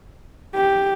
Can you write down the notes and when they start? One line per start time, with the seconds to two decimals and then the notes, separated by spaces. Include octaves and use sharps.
0.55 G4